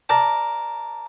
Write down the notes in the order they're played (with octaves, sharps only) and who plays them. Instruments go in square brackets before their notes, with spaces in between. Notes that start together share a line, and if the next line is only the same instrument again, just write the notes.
[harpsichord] A#4 D5 A5